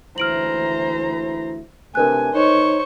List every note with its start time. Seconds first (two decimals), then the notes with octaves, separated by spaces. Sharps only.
0.18 D2 E3 E4 C5 A#5 F6 D7 F#7
1.95 C3 A3 D4 A#4 B4 G#5 F#6
2.34 D#4 C5 C#5 C#6